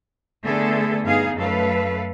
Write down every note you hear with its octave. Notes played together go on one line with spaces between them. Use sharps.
D3 A3 B3 G#4 A4
G2 B3 D#4 G#4 F5
F#2 A3 A4 B4 F5